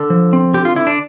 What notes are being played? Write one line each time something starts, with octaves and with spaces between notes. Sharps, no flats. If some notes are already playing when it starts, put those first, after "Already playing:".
Already playing: D3 A4
F3
C4
D3 G4
F4
D3 E4
D4